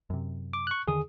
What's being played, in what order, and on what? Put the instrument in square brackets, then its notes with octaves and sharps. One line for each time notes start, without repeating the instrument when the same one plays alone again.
[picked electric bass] F#2 C3
[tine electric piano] D6
C#6 F#6
[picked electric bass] E2 D3 D#3 [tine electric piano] G#4 D#6